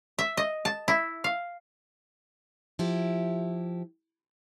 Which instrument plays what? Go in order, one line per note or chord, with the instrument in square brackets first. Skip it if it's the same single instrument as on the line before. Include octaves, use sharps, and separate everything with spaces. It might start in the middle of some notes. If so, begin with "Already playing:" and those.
[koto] E5
D#5
A5
E4
F5
[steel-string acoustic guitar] F3 E4 G4